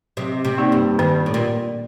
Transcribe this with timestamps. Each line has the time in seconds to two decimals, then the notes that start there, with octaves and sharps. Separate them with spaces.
0.17 C3 F#3
0.45 C3
0.58 A#3 D#4 G4 D5
0.72 G2
0.99 G2 D#3
1.26 A2
1.34 A#2
1.39 A#3